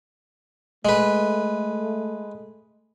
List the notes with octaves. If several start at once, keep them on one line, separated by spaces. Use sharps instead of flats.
G#3 A3 B4